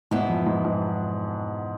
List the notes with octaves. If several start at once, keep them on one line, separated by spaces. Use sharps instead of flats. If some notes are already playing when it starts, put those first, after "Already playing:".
E2 G#2 B2 B3 E4
F2
G#2
G#2